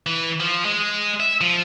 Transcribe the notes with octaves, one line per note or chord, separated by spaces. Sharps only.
E3
F3
G#3
E5
F3